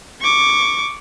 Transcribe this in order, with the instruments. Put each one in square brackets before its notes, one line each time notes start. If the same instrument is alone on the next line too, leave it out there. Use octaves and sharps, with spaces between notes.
[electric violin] C#6 D6